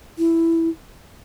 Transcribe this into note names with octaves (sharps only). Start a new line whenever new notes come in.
E4